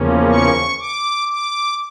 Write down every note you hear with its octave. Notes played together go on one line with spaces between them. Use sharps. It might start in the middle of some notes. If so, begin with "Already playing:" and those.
Already playing: E2 C#3 F3 A#3 C#4
C#6
D6
D6